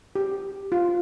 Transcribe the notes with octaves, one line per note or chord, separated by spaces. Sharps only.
G4
F4